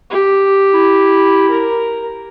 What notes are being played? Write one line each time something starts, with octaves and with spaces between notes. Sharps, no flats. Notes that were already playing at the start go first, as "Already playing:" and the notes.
G4
E4
A#4